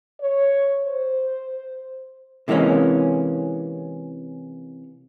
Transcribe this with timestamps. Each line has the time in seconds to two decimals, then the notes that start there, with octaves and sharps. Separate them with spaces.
0.20 C#5
0.85 C5
2.48 C3 E3 G#3 A#3 C#4